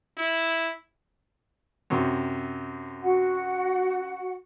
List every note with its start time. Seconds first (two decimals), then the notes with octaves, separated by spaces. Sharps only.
0.18 E4
1.90 F#2 C3
3.03 F#4 F#5